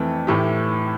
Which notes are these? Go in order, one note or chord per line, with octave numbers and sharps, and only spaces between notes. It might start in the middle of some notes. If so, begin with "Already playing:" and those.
Already playing: F2 E3 A3
A2 E3 A3 E4 G4